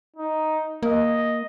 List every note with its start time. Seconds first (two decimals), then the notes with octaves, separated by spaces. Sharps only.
0.17 D#4
0.83 A#3 D#5